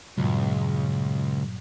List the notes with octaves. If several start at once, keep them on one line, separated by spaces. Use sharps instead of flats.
C#2 G2 A#2 F#3